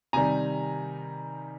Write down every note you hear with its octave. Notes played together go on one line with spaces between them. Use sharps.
C3 D#3 G3 G#5 A#5